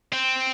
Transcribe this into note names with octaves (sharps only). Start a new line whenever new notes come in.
C4